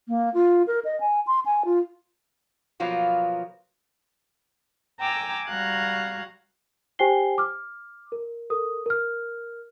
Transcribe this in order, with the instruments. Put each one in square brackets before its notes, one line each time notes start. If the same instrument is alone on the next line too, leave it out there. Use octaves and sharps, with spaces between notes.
[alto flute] A#3
F4
A#4
D#5
G#5
C6
G#5
F4
[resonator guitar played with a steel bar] B2 F3 F#3 A#3 B3 F4
[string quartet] G5 G#5 A#5 D6 E6
G3 F#4 F5 A#5 F#6 G#6
[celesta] G4 C5 G5 G#5 C7 G7
D6 F6
A#4
A4 A#4 D#6
A#4 F6